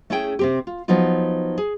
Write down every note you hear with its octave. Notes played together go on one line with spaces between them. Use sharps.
A3 C#4 E4 G#4 G5
C3 C4 G4
F4
F3 F#3 B3 D#4 F4
G#4